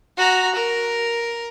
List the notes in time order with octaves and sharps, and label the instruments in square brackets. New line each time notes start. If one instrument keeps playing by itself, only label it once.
[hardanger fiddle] F#4 A#5
A#4